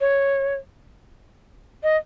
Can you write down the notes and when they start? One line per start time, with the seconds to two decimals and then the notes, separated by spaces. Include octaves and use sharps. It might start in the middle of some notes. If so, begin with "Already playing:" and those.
0.01 C#5
1.83 D#5